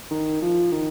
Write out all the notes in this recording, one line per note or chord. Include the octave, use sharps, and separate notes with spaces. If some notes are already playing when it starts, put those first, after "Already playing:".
D#3
F3
D#3